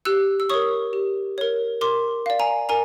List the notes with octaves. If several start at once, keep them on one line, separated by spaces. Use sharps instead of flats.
G4 E6 F#6
E6
A#4 C#5 C#6 D#6
G4
A#4 C#5
A#4 C6 D6
D5 F5
G#5 A#5
A#4 G#5 A#5